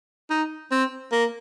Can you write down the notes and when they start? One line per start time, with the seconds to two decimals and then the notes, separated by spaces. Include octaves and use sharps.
0.30 D#4
0.71 C4
1.12 A#3